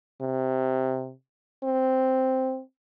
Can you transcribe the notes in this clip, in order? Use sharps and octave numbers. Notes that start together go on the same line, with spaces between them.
C3
C4